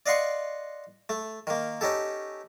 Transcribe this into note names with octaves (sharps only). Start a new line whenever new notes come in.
D5 D#5 F5 F#5 C6 C#6
A3
D#3 A#3
C#4 D#4 G4 A4